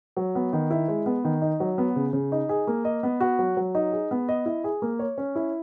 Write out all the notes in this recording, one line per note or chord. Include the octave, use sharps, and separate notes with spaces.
F#3
B3
D#3
E4
G#3
B3
D#3
D#4
F#3
B3
C#3
C#3
D#4
G#4
A#3
D#5
B3
F#4
F#3
F#3
D#4
G#4
B3
D#5
E4
G#4
A#3
C#5
C#4
E4